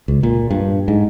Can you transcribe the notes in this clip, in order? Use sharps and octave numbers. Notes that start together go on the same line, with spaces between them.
C#2
A#2
G2
G#2